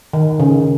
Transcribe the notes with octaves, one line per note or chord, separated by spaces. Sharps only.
D#3
C#3